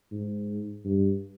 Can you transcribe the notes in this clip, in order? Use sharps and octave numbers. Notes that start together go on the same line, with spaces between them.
G#2
G2